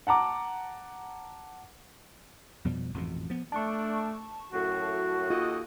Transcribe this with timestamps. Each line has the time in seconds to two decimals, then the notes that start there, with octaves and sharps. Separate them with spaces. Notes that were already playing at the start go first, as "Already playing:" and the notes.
0.07 F#5 A5 A#5 D6
2.65 F2 B2 F3 G3
2.94 A1 F2 G#2 B2
3.30 F3 B3
3.52 A3 D4 A5 C#6
4.53 F#2 A2 F#4
5.30 D#2 F4 A4 D#5